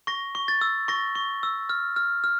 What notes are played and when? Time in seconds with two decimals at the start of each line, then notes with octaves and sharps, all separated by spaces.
0.07 C#6 A#6
0.35 C#6
0.48 A6
0.61 E6
0.88 C#6 A#6
1.15 C#6
1.43 E6
1.69 F6
1.96 F6
2.24 F6